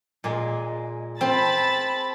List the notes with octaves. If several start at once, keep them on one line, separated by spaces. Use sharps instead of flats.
A#2 G#3
C4 A5 B5 A6